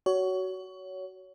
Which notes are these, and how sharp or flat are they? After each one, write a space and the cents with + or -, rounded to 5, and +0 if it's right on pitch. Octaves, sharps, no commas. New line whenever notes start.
F#4 +20 C#5 +20